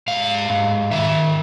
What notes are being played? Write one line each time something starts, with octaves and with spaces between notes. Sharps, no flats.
G#2 F5
G#2
D#3 E5